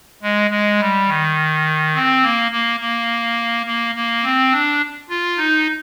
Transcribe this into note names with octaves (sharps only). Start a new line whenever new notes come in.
G#3
G#3
G3
D#3
C4
A#3
A#3
A#3
A#3
A#3
C4
D4
F4
D#4